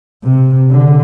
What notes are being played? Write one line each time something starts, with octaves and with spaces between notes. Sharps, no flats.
C3
D3